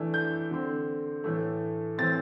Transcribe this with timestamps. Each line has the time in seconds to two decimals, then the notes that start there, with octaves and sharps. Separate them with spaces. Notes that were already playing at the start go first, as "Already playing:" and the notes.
Already playing: E3 A3 D4
0.14 G6
0.51 D3 C4
1.24 A2 E3 A3
1.98 A2 E3 C4 A6